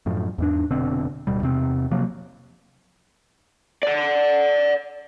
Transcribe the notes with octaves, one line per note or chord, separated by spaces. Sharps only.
F#2 A2 F3
E2 G#2 D4
F1 B2 D3 C4
D1 B2 G3
E2 C3 C4
C3 F3 F#3 A#3
D5 F#5